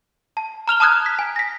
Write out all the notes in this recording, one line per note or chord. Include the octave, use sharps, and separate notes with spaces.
A5
A#5 F6 F7 G7
A5 A#5 D#6 F6 F#6 G#6
B6
G#5
A#6 B6